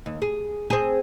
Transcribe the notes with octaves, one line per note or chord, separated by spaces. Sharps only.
D#2
G#4
C4 G#4